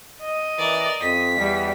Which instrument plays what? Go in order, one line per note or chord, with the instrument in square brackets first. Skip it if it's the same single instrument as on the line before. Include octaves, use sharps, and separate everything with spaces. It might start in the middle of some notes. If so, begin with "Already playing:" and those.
[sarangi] D#5
[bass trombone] E3 [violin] A#4 D5
[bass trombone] F2 [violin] B6
[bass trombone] E2 [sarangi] G3